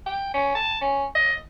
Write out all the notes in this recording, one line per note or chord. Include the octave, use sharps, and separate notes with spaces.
G5
C#4
A5
C#4
D#5